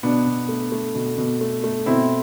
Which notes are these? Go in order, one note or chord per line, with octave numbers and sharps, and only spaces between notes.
B2 B3 D4
B2
A3
A3
B2
B2
A3
A3
B2 C4 E4